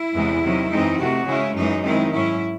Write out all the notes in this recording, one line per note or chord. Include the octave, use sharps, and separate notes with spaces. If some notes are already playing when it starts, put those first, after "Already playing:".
Already playing: E4
E2 C3 E3 G#3
C3 D#3 F#3
F#2 E3 G#3 C4 D#4
C3 D#3 A3 F#4
C#3 G#3 C#4 E4
F#2 E3 G#3 D#4
D#3 G#3 C4 D#4 E4
G#2 F#3 C#4 E4